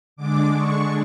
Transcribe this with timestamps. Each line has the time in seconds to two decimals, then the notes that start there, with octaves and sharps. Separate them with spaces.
0.16 D3 G#3 D4 D6
0.53 C#6